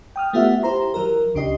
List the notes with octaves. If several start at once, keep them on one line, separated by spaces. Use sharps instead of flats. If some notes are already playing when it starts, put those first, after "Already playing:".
G5 D#6 F6
A3 B3 F4 G4 E5 F#5
E4 G4 C5 A#5 C6
E3 F#3 E4 A#4
C#2 C#3 D4 G4 D#5 C7